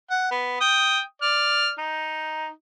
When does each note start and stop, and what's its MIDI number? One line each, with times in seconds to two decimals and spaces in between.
0.10 0.30 78
0.31 0.57 59
0.61 1.00 79
0.61 1.00 87
1.22 1.71 74
1.22 1.71 89
1.78 2.50 63